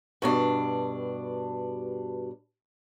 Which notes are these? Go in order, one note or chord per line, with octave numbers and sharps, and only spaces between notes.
G2 B2 D4